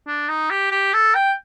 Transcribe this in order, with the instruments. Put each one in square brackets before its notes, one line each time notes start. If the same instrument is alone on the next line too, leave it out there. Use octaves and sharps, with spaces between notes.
[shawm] D4
D#4
G4
G4
A4
G5